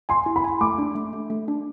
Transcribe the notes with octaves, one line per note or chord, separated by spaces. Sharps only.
G#5 C6
E4
B5
G#5
A3 D6
D4
A3
A3
A3
D4